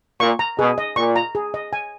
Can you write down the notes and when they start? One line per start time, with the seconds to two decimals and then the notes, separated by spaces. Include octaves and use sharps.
0.20 A#2 C#6
0.39 A#5
0.58 B2 G#4
0.78 D#5
0.96 A#2 C#6
1.16 A#5
1.35 G#4
1.54 D#5
1.73 G#5